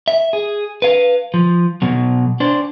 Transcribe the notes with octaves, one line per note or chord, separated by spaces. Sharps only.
E5
G#4
B4 F5
F3
B2 F#3
D4 C5